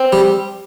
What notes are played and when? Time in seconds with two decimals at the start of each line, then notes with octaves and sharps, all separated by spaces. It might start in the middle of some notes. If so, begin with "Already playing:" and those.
Already playing: C4
0.13 G3